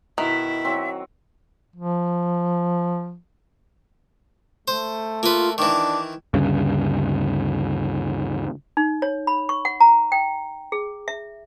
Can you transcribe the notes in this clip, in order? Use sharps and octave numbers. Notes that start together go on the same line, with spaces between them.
B2 D#3 E4 E5
F#3 C4
F3
A3 C5
A#3 F4 B4
D#3 E3 D4 D6
D2 G2 C#3
D#4
C#5
B5
C#6
F#5
A#5
G5
G#4
E5